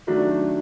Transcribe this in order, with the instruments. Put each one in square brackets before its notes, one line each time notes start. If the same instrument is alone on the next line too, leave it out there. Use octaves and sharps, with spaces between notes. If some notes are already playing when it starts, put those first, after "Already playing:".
[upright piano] D#3 F#3 A3 D4 F#4